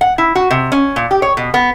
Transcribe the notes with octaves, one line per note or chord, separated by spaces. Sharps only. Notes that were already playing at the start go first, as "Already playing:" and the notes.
F#5
E4
F#4
C3
C#4
A#2
G4
C#5
B2
B3